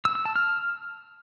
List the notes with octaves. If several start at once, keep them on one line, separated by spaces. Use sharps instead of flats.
E6
E6
A5
F6